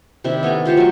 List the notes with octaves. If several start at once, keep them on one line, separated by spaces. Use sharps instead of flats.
C3 D#3 D4 E4
B3 A4 G#5 A#5
F4 G4 C5 C#5
F#3 A3 E5 A5